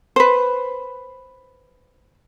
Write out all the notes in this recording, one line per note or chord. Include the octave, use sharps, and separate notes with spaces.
B4 C5